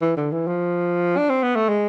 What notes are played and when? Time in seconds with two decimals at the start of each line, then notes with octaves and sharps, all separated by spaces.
0.02 E3
0.17 D3
0.32 E3
0.47 F3
1.17 D4
1.30 C4
1.43 B3
1.56 A3
1.69 G#3